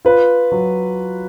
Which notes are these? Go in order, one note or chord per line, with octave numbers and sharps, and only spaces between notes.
F4 B4
F#3